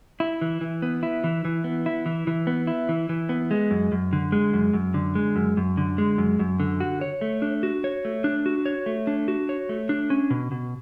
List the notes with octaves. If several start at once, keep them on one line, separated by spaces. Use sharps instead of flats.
E4
E3
E3
B3
E4
E3
E3
B3
E4
E3
E3
B3
E4
E3
E3
B3
G#3
F#2
F#2
D3
G#3
F#2
F#2
D3
G#3
F#2
F#2
D3
G#3
F#2
F#2
D3
F#4
C#5
A3
D4
F#4
C#5
A3
D4
F#4
C#5
A3
D4
F#4
C#5
A3
D4
C#4
B2
B2